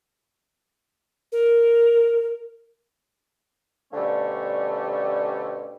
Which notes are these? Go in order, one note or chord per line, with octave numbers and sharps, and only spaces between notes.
A#4
B2 D3 F3 G3 A3 C#4